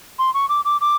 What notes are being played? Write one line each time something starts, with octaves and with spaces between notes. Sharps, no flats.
C6
C#6
D6
D6
D6